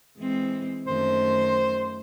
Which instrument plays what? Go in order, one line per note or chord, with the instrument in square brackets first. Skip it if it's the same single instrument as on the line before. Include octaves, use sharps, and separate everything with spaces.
[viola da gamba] E3 G#3 C4
[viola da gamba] F#2 D#3 A3 [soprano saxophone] C5